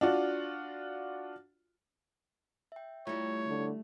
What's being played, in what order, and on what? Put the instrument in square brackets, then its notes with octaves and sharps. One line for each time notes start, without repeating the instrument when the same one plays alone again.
[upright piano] D4 F4 F#4
[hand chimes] E5 G5
[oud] G3 A3 [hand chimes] E4 F4 [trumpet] C#5
[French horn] D3